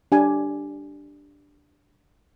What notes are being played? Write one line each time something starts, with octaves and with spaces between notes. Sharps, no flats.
D4 G4 G#5